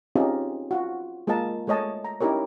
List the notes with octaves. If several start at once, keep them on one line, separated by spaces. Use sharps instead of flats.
C4 C#4 D#4 F4 G4 G#4
F4 F#4
G#3 A#3 F4 A#4 D#5 A5
G#3 A3 C#5 D#5 A5
A#5
C#4 D#4 E4 G4 A#4 C#5